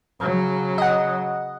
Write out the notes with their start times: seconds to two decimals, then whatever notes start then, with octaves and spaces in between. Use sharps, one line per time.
0.20 C#3 F#3
0.78 D#5 F#5